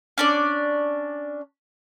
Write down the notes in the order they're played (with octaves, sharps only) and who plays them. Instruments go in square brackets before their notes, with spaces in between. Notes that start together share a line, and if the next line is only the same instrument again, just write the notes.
[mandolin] C#4 D4 D5